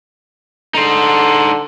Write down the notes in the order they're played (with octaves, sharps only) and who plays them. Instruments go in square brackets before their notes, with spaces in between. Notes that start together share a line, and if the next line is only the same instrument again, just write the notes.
[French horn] D3 [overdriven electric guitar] D#4 C5